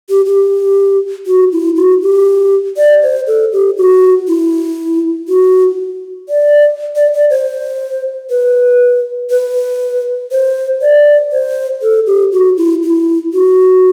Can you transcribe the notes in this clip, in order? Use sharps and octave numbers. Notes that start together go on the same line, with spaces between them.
G4
G4
F#4
E4
F#4
G4
D5
C5
A4
G4
F#4
E4
F#4
D5
D5
D5
C5
B4
B4
C5
D5
C5
A4
G4
F#4
E4
E4
F#4